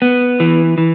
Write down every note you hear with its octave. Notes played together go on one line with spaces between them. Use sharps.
B3
E3
E3